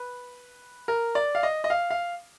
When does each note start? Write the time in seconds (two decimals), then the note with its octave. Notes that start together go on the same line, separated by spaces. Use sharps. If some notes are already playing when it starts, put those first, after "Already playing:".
Already playing: B4
0.88 A#4
1.15 D5
1.35 F5
1.43 D#5
1.64 D#5
1.70 F5
1.91 F5